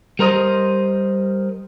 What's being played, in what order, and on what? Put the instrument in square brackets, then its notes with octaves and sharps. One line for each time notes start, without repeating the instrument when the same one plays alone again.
[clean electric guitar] G3 A#4 C5 D#5